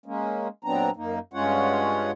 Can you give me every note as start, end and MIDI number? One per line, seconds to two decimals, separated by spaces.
0.06 0.48 56
0.06 0.48 58
0.06 0.48 61
0.64 0.90 46
0.64 0.90 54
0.64 0.90 59
0.64 0.90 60
0.64 0.90 62
0.64 0.90 82
0.97 1.19 42
0.97 1.19 58
0.97 1.19 63
1.34 2.11 43
1.34 2.11 56
1.34 2.11 61
1.34 2.11 65
1.34 2.11 73
1.34 2.11 78